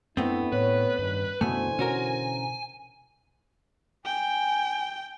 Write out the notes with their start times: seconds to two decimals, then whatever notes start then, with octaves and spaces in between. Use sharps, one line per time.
0.17 F#2 A3 B3 C4 D4 E4
0.52 A2 B4 C#5
0.99 G2 D#3 G3 C#4
1.41 F#2 B2 D3 E3 A3 C5 G#5
1.79 B2 C#4 F#4 A#4
4.05 G5 G#5